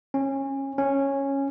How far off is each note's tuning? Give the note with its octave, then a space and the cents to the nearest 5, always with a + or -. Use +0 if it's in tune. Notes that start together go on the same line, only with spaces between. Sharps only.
C#4 -25
C#4 -10